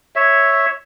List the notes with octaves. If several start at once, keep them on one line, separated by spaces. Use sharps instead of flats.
C#5 E5